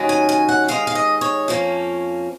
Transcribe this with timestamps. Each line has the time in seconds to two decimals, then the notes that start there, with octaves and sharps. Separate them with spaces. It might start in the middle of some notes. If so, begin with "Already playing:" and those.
Already playing: D#2 D#3 F#3 C#4
0.09 G#5
0.29 G#5
0.49 F#5
0.68 D#2 D#3 G#3 F5
0.87 F5
0.95 D#5
1.21 C#5
1.48 F2 F3 A#3 C#4